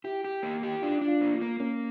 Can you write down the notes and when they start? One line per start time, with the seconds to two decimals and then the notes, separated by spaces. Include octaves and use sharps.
0.04 E4 G4
0.24 G4
0.43 A#3
0.63 G4
0.82 D4 F4
1.01 D4
1.08 F4
1.21 A#3
1.34 F4
1.41 A#3
1.60 A#3 C#4